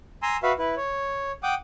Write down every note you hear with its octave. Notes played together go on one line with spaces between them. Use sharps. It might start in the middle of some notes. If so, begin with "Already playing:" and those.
G#5 A#5 C6 E6
F#4 B4 E5 F5
E4 B4
C#5
F#5 G5 D6 D#6